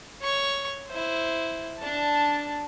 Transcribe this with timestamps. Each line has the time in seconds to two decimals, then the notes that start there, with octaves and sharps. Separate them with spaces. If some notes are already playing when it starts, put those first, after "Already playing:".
0.22 C#5 C#6
0.88 E4 C5
1.78 D4 A5